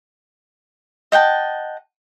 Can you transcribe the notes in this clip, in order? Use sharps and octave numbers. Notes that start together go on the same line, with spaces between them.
D#5 F#5 G5 A5